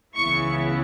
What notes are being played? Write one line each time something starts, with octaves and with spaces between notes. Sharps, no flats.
C#2 C#3 E3 B3 E4 C#6